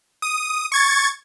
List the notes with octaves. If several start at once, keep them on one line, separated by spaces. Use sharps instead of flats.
D#6
C#6 G#6 A6